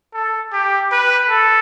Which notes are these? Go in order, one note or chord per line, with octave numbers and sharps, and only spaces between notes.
A4
G4
B4
A4